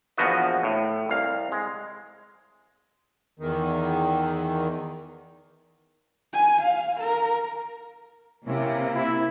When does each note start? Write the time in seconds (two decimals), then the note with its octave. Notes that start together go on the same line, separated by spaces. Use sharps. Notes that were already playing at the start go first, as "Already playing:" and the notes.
0.17 A#1 E2 F3 B3 F#4 D#5
0.63 A2
1.10 C2 F5
1.52 G#3
3.39 E2 D#3
6.32 G#5
6.61 F5
7.00 A#4
8.47 C3 A#3 C#4 E4
8.95 E4